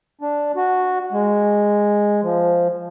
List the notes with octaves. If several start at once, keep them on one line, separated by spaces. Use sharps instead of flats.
D4
F#4
G#3
F3